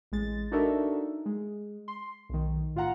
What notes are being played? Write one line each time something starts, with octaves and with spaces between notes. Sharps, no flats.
A1 G#3 A6
D4 D#4 F#4 A4 A#4 E5
G#3
C6
B1 D#3
A2 F4 F5 F#5 A#5